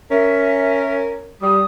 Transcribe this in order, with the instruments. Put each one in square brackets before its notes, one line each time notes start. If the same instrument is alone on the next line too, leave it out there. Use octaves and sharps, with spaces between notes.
[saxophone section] C#4 A#4 [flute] E5
[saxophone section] G3 [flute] D#6